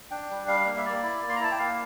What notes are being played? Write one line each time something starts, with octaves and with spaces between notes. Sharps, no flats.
D4 G5
G3
G3 F5
A#3
E5
A#3 D5
E4
A#3
C6
A#5
E4 A5
G5
A#3 F5